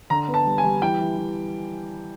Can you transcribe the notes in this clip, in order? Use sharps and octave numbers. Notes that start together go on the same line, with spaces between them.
D3 A#5
B3
A5
G3
G#5
G3
E3 G5
E3
E3